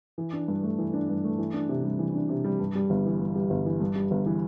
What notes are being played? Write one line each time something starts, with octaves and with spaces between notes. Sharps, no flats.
E3
D4
G2
A3
E3
D4
G2
A3
E3
D4
C3
G3
E3
D4
C3
G3
G2
G3
G1
E3
G2
G3
G1
E3
G2
G3
G1
E3